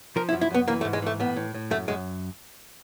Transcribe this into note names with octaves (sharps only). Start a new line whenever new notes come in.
F3 A#4
E4
F#2
E4
F#2 B3
E3 A#3
A3
G#2
G#3
E3 A3
A2 B3
A2
A2
F#2 A3
F#2 G#3